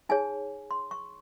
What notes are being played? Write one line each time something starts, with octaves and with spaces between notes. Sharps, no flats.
D#4 G#4 C#5 G#5
C6
C#6